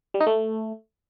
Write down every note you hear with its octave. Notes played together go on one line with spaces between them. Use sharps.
G3
D#4
A3